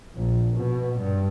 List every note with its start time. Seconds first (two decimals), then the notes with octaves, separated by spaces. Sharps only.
0.16 A#1
0.55 B2
0.99 G2